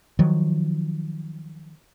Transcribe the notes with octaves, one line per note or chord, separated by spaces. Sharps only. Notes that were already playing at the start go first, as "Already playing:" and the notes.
D#3 F3 F#3